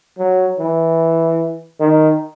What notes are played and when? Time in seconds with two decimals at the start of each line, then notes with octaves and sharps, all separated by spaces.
0.19 F#3
0.59 E3
1.80 D#3